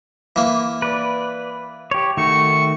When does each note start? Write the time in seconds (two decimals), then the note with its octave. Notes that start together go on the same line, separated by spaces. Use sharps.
0.36 E3 A#3
0.82 B4 D5
1.91 G4 C#5
2.17 D#3 A3 F#4 C#6